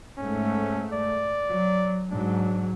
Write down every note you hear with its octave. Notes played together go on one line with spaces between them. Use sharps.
G#2 A3 C#4
D5
F#3
G#2 F#3 D4